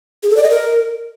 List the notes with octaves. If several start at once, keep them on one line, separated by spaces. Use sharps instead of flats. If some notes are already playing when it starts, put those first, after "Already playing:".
G#4
A4
D5
D#5
A#4